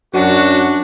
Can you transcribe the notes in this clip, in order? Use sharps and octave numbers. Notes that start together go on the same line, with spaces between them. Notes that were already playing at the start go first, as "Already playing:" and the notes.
F#2 D4 F#4